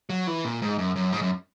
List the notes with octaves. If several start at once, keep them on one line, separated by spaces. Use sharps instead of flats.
F#3
E3
A#2
G#2
F#2
F#2
G#2
F#2